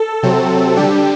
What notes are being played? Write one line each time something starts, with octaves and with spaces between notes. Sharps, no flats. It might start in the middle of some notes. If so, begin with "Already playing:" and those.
Already playing: A4
C3 F#3 C4
D3 G3 D4 G4